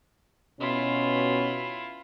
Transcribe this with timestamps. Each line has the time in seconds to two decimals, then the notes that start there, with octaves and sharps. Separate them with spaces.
0.60 B2 C#4 E4 F4